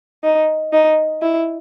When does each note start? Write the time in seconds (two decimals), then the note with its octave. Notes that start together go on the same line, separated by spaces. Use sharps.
0.24 D#4
0.73 D#4
1.22 E4